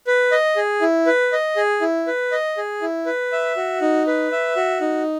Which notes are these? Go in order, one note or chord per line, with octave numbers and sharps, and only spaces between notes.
B4
D#5
G#4
E4
B4
D#5
G#4
E4
B4
D#5
G#4
E4
B4
E5
F#4
D#4
B4
E5
F#4
D#4